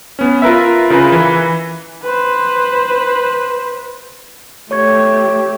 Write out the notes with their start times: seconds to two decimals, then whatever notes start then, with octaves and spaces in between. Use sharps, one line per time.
0.19 B3 C#4
0.42 F4 A#4 B4 E5
0.90 C#3 E4 F4 A#4 B4
1.12 E3 B4
2.03 B4 C5
4.71 A3 G4 C#5 C#6 G#6